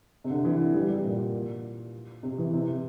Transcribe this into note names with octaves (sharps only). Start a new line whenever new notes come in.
C3
D3
E3
G3
G3
A#2
C3
E3
C3